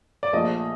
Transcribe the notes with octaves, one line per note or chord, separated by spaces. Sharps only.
D5
A#1 A#2 F3 A3 D#5